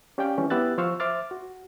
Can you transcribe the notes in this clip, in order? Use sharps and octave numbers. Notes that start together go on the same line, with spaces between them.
C#4 G4 D5 F5 G5
E3 G3 C#4
B3 E4 G4 E6 F#6 A6
F3 C5 F5 C#6 E6
C5 E5 C6 D6 F6 A6
F#4